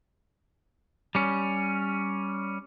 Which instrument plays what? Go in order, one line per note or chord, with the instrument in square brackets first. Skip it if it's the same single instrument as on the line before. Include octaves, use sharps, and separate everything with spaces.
[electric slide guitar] G3 C#4